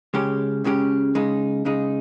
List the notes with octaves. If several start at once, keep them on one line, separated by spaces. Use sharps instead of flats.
C#2 C#3 G#3 C#4 G4
C#2 C#3 G#3 C#4 G4
C#3 G#3 D#4
C#3 G#3 D#4